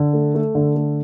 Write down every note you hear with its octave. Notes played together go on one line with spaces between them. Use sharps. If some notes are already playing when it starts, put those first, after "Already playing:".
Already playing: D3
A3
A3
D3
A3